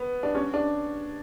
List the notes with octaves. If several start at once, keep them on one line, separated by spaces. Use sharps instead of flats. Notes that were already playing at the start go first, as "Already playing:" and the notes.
Already playing: B3
D4
C#4
D4